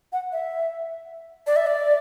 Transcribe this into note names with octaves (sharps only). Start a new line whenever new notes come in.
F#5
E5
D5
E5
D5